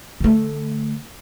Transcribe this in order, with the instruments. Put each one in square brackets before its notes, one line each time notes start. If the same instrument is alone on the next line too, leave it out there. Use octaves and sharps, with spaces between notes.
[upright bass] D3 A3